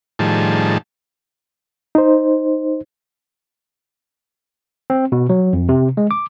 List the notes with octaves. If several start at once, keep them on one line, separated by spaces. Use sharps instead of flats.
A2 D#3 F3 G3 G#4 A5
D#4 C5
C4
B2
F#3
F2
C3
G#3
D6